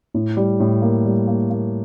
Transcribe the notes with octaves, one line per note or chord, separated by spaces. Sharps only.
A2
G3
A2
A#3
G3
A#3
A#3